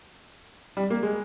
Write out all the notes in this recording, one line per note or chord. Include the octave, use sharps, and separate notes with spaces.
G3
A#3
G#3